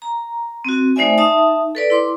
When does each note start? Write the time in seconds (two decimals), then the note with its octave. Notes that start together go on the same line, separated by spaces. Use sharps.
0.02 A#5
0.65 C4 F#4
0.96 A3 D#4 C5 D5 E5 G#5
1.18 D#4 E5 A5 D#6
1.75 A4 B4 D5
1.90 E4 C6 D6